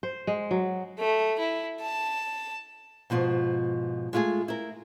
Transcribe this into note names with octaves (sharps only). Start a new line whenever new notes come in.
C5
G#3
F#3
A3
E4
A5
G#2 B2 F3 F4
G#3 A3 F4 F#4 G#4
E4 A#4